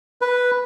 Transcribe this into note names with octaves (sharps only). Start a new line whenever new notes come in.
B4